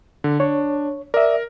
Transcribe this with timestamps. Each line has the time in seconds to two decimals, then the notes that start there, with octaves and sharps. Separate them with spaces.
0.24 D3
0.40 D4 C#5
1.14 A#4 D5 E5